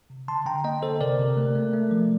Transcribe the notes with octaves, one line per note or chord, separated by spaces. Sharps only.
C3
D3 A5 C6
D3 G5 A#5
A#3 D#5 G5
D3 A4 C5
C3 A#4 D5
C3
A3
A3
A3
F3